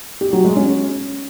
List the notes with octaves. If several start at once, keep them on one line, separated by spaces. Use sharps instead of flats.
G4
F#3
G#3
C#4